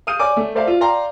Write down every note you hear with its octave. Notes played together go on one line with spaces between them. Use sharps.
F5 D#6 F6 G6 D#7
C#5 D5 G#5 D6
A3
A4 C5 D5 E5 F5 A5
F4
D5 F5 G5 A#5 C6